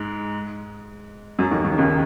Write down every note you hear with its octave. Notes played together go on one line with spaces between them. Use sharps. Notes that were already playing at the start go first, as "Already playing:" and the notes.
Already playing: G#2 G#3
F#2 F#3
D#2 D#3
D#2 D#3
C#2 C#3